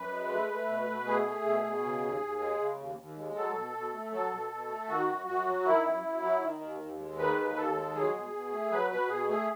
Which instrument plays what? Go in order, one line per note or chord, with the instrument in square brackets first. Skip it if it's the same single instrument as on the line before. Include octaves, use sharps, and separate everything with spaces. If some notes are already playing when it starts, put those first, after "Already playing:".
Already playing: [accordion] F#2 B4
G#3
A3
A3
B2
B2
A3 G#4
A3
B2
B2
C#3
D#2
D#2
G#3
C#3
D#2
D#2
G#3
F#3 A4
B2
B2
A3
F#3 A4
B2
B2
A3
D#3 F#4
F#2
F#2 F#4
F#3
D#3 E4
F#2
F#2
F#3
D#3
D#2
D#2
G#3
D#3 B4
D#2
D#2 A4
G#3
F#3 G#4
B2
B2
A3
F#3 B4
B2 B4
B2 G#4
A3 G#4